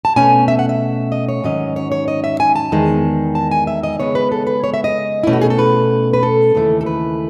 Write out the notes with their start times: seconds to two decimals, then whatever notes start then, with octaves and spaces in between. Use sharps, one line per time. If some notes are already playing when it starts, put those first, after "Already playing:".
0.05 A5
0.16 B2 A3 C#4 G#5
0.48 E5
0.59 F#5
0.69 E5
1.12 D#5
1.29 C#5
1.44 G#2 D#3 F#3 C#4 D#5
1.76 C#5
1.92 C#5
2.08 D#5
2.24 E5
2.40 G#5
2.56 A5
2.72 E2 D#3 G#3
3.35 A5
3.51 G#5
3.67 E5
3.83 D#5
3.99 C#3 G#3 B3 C#5
4.15 B4
4.32 A4
4.47 B4
4.64 C#5
4.74 E5
4.84 D#5
5.23 B2 A3 C#4 E4
5.33 F#4
5.41 G#4
5.50 A4
5.59 B4
6.13 B4
6.23 A4
6.55 D#2 C#3 E3 A3
6.81 A4
6.86 B4